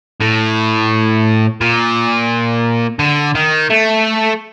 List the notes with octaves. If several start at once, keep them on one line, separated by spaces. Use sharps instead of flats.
A2
A#2
D3
D#3
A3